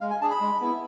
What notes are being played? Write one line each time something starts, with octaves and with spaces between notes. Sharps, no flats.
G#3 F5
G#5
D4 G#4 A5
B5
G#3
B3 E4